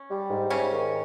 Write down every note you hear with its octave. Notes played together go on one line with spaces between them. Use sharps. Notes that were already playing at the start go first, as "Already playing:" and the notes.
Already playing: C#4
G3
G#2
G#2 C#3 C#4
D#3